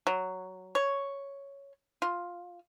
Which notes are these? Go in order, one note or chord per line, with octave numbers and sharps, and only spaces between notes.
F#3
C#5
F4